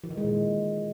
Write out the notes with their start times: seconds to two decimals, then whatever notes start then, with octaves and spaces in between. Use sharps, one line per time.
0.04 E3
0.11 D#3
0.17 G#3
0.24 A#2